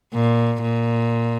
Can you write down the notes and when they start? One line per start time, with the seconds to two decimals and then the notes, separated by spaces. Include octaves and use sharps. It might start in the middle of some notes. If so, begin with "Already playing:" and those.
0.14 A#2
0.62 A#2